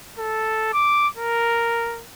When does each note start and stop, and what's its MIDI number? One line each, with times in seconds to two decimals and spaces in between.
0.18 0.70 69
0.73 1.08 86
1.17 2.03 70